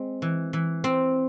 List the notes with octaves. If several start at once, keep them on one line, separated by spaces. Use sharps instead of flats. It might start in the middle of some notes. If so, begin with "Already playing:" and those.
Already playing: G#3 C4
E3
E3
C4